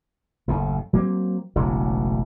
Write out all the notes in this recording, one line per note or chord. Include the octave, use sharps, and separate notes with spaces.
F#1 D#2 A2
F#3 A#3 C4
E1 A1 C#3 F#3